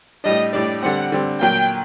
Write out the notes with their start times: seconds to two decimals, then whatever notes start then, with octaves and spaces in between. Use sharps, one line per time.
0.24 A2 G3 D4 D#5
0.53 A2 G3 D4 D5
0.82 D3 G3 C4 F#5
1.12 D3 G3 C4
1.41 A#2 F#3 A#3 G5